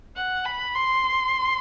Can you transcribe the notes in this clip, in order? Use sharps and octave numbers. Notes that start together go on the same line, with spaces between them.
F#5
B5
C6